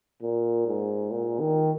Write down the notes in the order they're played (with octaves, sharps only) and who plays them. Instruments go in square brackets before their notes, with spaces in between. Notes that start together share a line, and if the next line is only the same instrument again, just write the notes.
[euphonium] A#2
G#2
A#2
D#3